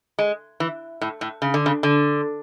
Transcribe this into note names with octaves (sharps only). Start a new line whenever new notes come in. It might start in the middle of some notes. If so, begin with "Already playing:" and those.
G#3
E3
A2
A2
C#3
D3
C#3
D3